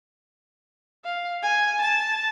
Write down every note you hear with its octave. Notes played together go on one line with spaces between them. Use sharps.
F5
G#5
A5